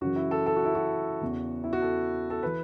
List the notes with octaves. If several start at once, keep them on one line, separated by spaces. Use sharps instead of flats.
F#2 C#3 E3 F#4
E4
A4
A4
F#4
E4
F#4
E2 C#3 E3
E4
F#4
A4
A4
E3 B4